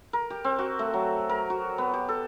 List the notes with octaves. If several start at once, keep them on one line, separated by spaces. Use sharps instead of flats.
A#4
G4
C4
F#4
A3
F#3
A#4
F#4
B3
G4
A4